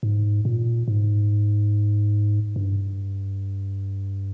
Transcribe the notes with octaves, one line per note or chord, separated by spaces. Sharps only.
G#2
A#2
G#2
G2